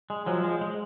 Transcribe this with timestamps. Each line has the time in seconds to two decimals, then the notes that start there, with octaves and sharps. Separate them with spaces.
0.10 G#3
0.26 F3 F#3
0.44 G#3
0.61 G#3